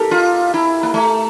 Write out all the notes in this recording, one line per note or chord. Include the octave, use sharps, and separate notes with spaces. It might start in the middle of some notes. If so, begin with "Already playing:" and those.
Already playing: G4 A4 A#4
F4
E4
A#3
A3